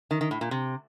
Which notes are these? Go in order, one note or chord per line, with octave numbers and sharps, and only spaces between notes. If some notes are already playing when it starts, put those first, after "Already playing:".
D#3
D#3
A2
A#2
C3